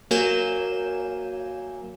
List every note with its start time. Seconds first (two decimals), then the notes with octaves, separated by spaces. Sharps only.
0.11 F#3 A#3 G#5 G6 E7